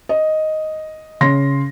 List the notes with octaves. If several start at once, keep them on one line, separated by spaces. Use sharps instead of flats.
D#5
C#3 C6 A#6